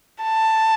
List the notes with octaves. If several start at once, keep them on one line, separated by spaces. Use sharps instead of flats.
A5